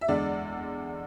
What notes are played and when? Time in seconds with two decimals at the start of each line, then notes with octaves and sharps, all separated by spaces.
0.01 E5
0.08 E2 D3 G#3 D5